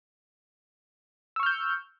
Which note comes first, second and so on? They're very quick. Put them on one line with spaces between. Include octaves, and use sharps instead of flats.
E6 C#6 F6 G6